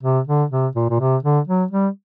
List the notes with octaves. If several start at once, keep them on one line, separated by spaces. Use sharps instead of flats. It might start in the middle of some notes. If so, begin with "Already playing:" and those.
C3
D3
C3
A#2
A#2
C3
D3
F#3
G3